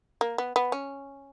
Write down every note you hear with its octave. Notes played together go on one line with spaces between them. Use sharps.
A#3
B3
B3
C#4